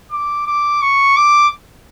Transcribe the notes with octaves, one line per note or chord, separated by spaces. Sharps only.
D6
D6
C#6
D6